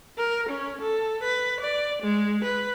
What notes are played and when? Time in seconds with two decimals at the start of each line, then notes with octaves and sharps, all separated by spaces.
0.18 A#4
0.49 C#4
0.81 A4
1.23 B4
1.60 D5
2.02 G#3
2.44 B4